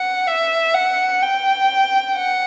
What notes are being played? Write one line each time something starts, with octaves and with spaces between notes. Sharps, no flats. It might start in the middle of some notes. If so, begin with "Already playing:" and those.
Already playing: F#5
E5
F#5
G5
F#5